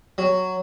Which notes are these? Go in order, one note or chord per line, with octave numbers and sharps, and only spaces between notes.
F#3